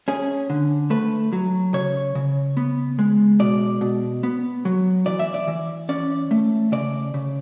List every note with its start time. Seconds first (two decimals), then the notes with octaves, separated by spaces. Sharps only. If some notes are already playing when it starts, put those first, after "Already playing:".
0.08 C#4 G#4
0.50 D3
0.90 A3 B4
1.33 F#3
1.74 C#3 C#5
2.15 C#3
2.57 B3
2.99 G#3
3.39 B2 D5
3.81 B2
4.23 B3
4.65 F#3
5.06 E3 D5
5.19 E5
5.34 D5
5.48 E3
5.89 C#4 D5
6.31 A3
6.72 C#3 D5
7.14 C#3